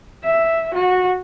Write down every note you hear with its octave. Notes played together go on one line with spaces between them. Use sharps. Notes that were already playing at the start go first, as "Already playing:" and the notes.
E5
F#4